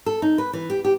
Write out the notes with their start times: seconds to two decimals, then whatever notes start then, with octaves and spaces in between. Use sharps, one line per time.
0.06 A4
0.22 D#4
0.38 B4
0.53 E3
0.70 G4
0.85 G4